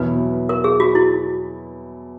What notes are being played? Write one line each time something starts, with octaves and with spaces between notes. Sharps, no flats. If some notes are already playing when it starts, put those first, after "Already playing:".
Already playing: E2 B2 F#3 B3 E4 B4
A#4
G#4
F#4
E4